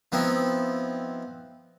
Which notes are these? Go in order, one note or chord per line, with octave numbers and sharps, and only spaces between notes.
F3 B3 C4 D#4 E4